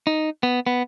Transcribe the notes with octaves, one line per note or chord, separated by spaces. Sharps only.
D#4
B3
B3